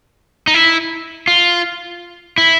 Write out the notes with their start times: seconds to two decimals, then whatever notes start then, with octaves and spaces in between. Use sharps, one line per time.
0.47 D#4
0.54 E4
1.28 F4
2.38 E4